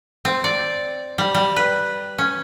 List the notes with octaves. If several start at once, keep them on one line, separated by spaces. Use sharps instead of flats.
C4
D5
G3
G3
B4
C#4